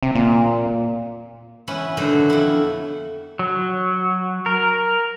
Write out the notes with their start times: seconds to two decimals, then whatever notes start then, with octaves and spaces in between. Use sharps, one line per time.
0.03 C3
0.15 A#2
1.68 E3 B3 C#4 E4
1.97 B2 D3 D#3 F#3 A3
2.30 F2 E4
3.39 F#3
4.46 A#4